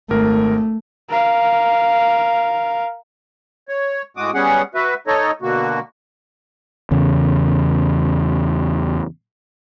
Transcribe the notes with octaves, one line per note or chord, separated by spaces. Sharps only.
G#1 A3 A#4
A#4 F5
C#5
A2 G#3 F#4 D6 D#6
G3 B3 C#4 G#4 F#5
F#4 B4 E5
D#4 A4 C#5 D#5
B2 D3 A#3 F#4
E2 C#3